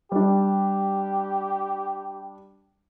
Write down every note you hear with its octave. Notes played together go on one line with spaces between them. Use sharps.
G3 D4 G4